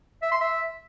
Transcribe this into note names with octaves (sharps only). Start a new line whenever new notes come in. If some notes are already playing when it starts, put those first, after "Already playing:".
E5
C6
E5